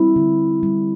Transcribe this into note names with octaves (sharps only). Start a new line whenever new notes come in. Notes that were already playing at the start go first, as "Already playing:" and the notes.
Already playing: G3 C4 E4
D3
G3